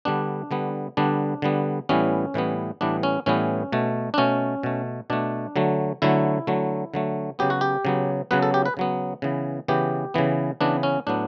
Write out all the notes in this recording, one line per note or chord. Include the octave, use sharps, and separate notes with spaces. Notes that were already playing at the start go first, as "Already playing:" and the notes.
D3 G3 B3 D4
D3 G3 B3
D3 G3 B3 D4
D3 G3 B3
A2 E3 G3 B3 C#4
A2 E3 G3 B3
A2 E3 G3 B3 D4
C#4
A2 E3 G3 B3 C#4
B2 A3
D4
B2 A3 C#4
B2 A3
B2 A3 D4
D3 F#3 A3
D3 F#3 A3 E4
D3 F#3 A3
D3 F#3 A3
C#3 F#3 B3 G4
F#4
G4
C#3 F#3 B3
C#3 F#3 B3 B4
A4
G4
B4
C#3 F#3 B3
C#3 E3 B3
C#3 E3 B3 G4
C#3 E3 B3
C#3 E3 B3 D4
C#4
A2 F#3 B3 D4